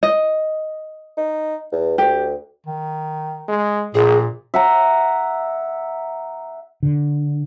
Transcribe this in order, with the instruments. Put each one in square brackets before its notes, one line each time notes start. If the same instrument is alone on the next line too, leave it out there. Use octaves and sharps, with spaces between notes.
[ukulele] D#5
[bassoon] D#4
E2
[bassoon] D2 [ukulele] G4
[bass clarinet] D#3
[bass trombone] G#3
[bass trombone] A#1 [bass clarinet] A#2 [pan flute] G#4
[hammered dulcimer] E5 F#5 A#5
[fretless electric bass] D3